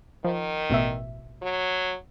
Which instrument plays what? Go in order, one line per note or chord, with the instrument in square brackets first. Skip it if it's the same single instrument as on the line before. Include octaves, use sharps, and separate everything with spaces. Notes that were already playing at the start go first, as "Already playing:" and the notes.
[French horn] D#3 [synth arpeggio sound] F3
[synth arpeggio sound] A1 B2 E5
[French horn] F#3